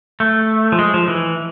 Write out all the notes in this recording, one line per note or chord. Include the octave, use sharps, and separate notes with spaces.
A3
F3
G#3
F3
E3